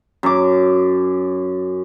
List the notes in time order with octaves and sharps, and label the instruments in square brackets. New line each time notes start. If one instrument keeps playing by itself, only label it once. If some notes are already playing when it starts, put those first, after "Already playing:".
[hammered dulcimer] F#2 D6